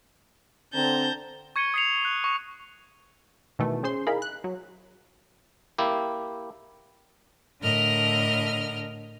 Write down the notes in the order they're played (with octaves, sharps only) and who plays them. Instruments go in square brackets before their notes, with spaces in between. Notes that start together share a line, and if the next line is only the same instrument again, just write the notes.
[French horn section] D3 C4 [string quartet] A5 A#5 G6
[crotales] C#6 G#6 C#7 D#7 G7
D#6 G#6 C7 C#7 F7
F#6
C#6
[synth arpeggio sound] B2 D#3 E3 A3
C#4 G#4 C5 C6
D#4 E4 G#4 A#4 F5 B5
F#6
F#3
[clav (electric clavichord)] A#3 E4 G4
[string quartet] A2 D3 A#4 D#5 F6